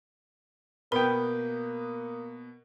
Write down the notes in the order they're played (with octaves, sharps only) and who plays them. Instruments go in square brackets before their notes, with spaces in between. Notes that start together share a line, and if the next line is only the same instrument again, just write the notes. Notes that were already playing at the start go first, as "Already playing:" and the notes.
[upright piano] B2 B3 [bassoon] A#3 [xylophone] A#4 [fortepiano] B4 G5